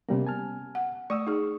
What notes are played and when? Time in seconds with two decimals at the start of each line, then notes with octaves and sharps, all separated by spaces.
0.09 C3 G3 A#3 B3 C#4
0.27 G#5 A5 F6
0.75 F#5
1.10 A3 D5 C#6 D#6 E6
1.27 D#4 G#4